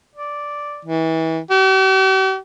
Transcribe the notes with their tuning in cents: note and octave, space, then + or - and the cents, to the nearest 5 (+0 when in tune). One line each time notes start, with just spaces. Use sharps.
D5 -5
E3 -30
G4 -45